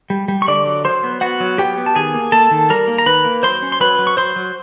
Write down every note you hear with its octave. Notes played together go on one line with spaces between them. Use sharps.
G3
G3
C#6
D3 D5 D6
F#3
F#3 C5 C6
B3
B3 F#4 F#5
F#3
B3 G4 G5
B3
A5
D#3 G#4 G#5
A#3
A#3 A4 A5
D#3
G3 A#4 A#5
A#3
A#5
D#3 B4 B5
A#3
F#3 C5 C6
C#4
C6
F#3 B4 B5
F#3
C#6
F#3 C5 C6
F#3